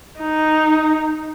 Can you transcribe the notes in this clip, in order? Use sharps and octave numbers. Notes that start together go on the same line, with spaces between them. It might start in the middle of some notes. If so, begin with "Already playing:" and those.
D#4